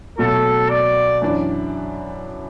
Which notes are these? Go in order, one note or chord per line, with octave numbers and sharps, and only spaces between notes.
B2 F#3 A3 F#4 A4
D5
F#2 E3 D4